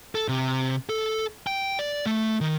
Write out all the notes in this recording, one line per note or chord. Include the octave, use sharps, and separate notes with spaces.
A4
C3
A4
G5
D5
A3
D#3